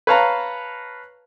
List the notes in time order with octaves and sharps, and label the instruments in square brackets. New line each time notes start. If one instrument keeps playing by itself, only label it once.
[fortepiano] B4 C#5 F5 A5 A#5